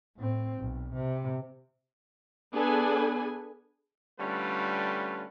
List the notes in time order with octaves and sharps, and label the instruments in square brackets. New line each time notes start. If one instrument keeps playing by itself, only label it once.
[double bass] A2 C4
B1
C3
[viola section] B3 D4 G#4 A4 B4 G#5
[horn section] D3 G3 A3 C#4 F4 B4